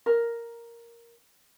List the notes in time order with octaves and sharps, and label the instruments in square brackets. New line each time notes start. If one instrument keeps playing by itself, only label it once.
[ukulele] A#4